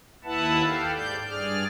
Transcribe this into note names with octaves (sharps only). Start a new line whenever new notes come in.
D#2 E4 B4 E5 F#5 A5
G4 A4 F5
G#2 D5 G6
G2 G#4 D5 F6